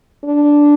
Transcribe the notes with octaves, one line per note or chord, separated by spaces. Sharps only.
D4